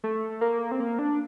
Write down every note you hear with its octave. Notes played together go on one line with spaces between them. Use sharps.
A3
A#3
C4
A#3
D4